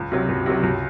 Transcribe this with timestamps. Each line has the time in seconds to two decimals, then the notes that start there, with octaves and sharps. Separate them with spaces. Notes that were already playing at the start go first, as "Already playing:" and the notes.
Already playing: C#2
0.12 C3 F#3
0.29 C#2
0.46 C3 F#3
0.63 C#2